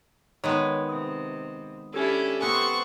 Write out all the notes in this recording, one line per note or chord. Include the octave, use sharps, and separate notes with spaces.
D#3 G#3 B3 C#5
C3 D#6
C#4 D4 E4 G4 A4
B3 C4 C5 F#5 A5 C#6